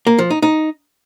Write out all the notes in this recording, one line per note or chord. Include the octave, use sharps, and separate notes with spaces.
A#3
F3
D#4
D#4